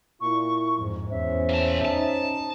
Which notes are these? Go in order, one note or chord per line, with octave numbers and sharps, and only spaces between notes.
A#2 E4 C#6
F2 G#2
E2 C#4 C5 E5
A#3 A5
D#4 A5